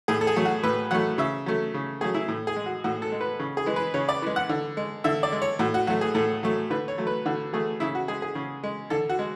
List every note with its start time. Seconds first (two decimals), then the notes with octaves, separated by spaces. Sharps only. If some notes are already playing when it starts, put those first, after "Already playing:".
0.08 A2 G#4
0.21 A4
0.27 G#4
0.36 F#3 A3
0.45 F#4
0.63 A2 B4
0.91 F#3 A3 F#5
1.18 C#3 E5
1.46 F#3 A3
1.74 C#3
2.01 F#3 A3 G#4
2.14 E4
2.28 A2
2.47 G#4
2.56 G#3
2.66 F#4
2.84 A2 F#4
3.02 A4
3.12 G#3
3.21 B4
3.39 C#3
3.57 G#4
3.66 E3 G#3
3.76 B4
3.94 C#3 C#5
4.09 D5
4.22 E3 G#3
4.36 F#5
4.49 D3
4.77 G#3
5.04 D3 E5
5.23 D5
5.32 G#3
5.42 C#5
5.59 A2 F#4
5.74 F#4
5.87 F#3 F#4
5.90 A3
6.01 G#4
6.15 A2 A4
6.43 F#3 A3
6.70 D3 B4
6.88 C#5
6.98 F#3 A3
7.07 B4
7.26 D3 F#4
7.53 F#3 A3 G#4
7.80 C#3 E4
7.95 F#4
8.08 G#3 G#4
8.22 G#4
8.35 C#3
8.63 G#3
8.90 D3 A4
9.10 F#4
9.19 G#3